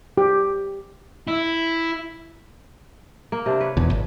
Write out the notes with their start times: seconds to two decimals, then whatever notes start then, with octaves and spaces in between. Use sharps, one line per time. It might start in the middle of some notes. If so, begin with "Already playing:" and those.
0.18 G4
1.28 E4
3.32 A#3
3.46 C3 D4 C5
3.61 B4 C#5
3.77 E1 E2 F3
3.91 G#1